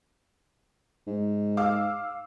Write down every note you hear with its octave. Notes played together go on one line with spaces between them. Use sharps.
G#2
F5 D6 E6